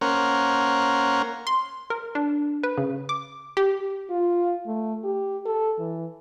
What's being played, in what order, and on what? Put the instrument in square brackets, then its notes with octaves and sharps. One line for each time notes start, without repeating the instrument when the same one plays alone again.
[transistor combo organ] A#3 C#4 A#4 C5 F#5
[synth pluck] C6
A#4
D4
B4
C#3
D6
G4
[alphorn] F4
A3
G4
A4
E3